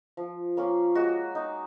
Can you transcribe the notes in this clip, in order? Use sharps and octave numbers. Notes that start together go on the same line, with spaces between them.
F3
A#3 C#4 F4
G#3 F#4
D#4